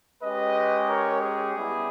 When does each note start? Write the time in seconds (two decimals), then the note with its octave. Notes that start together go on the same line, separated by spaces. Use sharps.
0.22 G#3 C#4 G4 B4 D#5
0.87 A#4 C#5
1.20 G#4
1.54 G3 B3 E4 G4